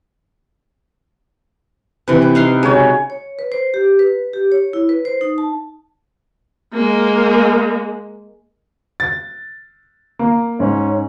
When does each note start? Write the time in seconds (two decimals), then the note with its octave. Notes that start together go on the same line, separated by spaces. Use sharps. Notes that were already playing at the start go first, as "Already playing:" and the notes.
2.08 C3 E3 B4
2.22 G5
2.35 D#4 F5 C6
2.63 C#3 F#3 G#3 C#5
3.10 C#5
3.39 B4
3.52 C5
3.74 G4
3.99 B4
4.33 G4
4.52 C#5
4.73 E4
4.89 B4
5.05 C5
5.21 D#4
5.38 A5
6.74 G#3 A#3
9.00 A6
10.19 A#3
10.60 G#2 C#4